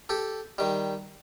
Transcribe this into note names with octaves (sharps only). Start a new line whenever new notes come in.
G4 A4
D#3 G3